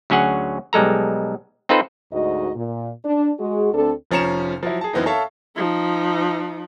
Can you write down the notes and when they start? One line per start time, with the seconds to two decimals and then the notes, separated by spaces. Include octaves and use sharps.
0.10 D2 F#3 C#4 G#4 F#5
0.73 B1 G3 G#3 A4 A#5
1.69 C4 D#4 F4 A4 B4 C5
2.12 D2 G#2 F#4 D#5
2.55 A#2
3.04 D4
3.39 G#3 F#4 G#4
3.73 D2 C4 D4 A4
4.11 F1 F3 C#4 A#5 C#7 E7
4.63 F3 F#3 E4
4.81 G#4 A5
4.93 F#2 E3 B3 C4 D#4
5.06 A4 C#5 E5 F5 A5
5.56 F3 D#4